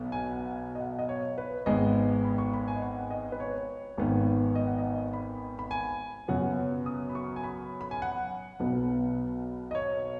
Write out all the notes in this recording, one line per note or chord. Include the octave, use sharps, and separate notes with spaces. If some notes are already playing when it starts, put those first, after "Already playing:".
Already playing: B1 B2 B3
G#5
F#5
G#5
D#5
F#5
D#5
C#5
B4
G#1 G#2 G#3 B3 D#5
B5
C#6
B5
G#5
D#5
F#5
D#5
B4
C#5
G#1 G#2 D#3 B3
D#5
F#5
D#5
B5
B5
G#5
F#2 C#3 F#3 B3 F#5
D#6
B5
C#6
G#5
B5
B5
G#5
F#5
B1 B2 B3
D#5
C#5